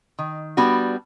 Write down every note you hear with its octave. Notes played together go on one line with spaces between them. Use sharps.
D#3
G3 B3 D4 F#4